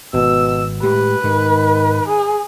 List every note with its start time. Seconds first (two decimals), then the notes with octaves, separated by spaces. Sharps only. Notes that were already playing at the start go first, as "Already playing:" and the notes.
0.14 G#1 B2 E6
0.83 A2 G#3 G4 B4
1.24 G#2 D#3
2.08 G#4